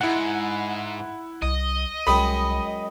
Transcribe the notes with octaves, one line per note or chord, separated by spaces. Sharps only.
G#2 E4 F#5
C2 D#5
C2 F#2 G#3 G4 B5 D#6